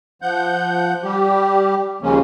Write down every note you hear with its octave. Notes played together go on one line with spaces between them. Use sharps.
F3 F#5 G6
G3 G4
D#2 C#3 F3 G#3 A#3 C#4